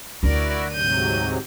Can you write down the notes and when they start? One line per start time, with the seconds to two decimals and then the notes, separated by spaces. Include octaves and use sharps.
0.23 D2 D4 E4 F#4 A#4 D5
0.73 G#2 C3 F#3 G6 D#7